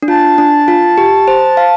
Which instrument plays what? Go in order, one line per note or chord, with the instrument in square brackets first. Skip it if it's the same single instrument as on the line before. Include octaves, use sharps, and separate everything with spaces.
[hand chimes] D4
[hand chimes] F4 [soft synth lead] A5
[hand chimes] D4
F4
G4
C5
F5